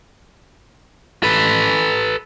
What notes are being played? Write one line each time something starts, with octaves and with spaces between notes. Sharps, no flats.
A4 B4